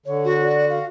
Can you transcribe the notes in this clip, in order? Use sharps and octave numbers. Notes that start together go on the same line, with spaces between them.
D3 C#5
F#4
D5
F5